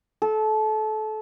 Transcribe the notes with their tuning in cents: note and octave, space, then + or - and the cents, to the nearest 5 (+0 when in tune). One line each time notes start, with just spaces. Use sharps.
A4 -25